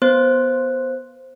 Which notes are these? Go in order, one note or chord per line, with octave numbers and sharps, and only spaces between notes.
B3 C5